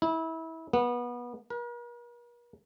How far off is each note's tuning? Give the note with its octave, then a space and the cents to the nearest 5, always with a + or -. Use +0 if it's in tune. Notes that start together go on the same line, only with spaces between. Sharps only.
E4 -25
B3 -25
A#4 +45